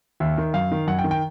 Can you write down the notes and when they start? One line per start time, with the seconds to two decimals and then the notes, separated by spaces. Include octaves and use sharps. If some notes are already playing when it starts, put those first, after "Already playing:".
0.20 D#2 E5
0.38 D#3
0.54 F#2 F5
0.72 D#3
0.87 F#2 F#5
0.99 G5
1.04 D#3
1.11 G5